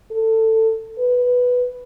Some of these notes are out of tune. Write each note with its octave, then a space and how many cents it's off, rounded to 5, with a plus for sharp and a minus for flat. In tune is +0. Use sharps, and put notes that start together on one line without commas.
A4 +20
B4 +0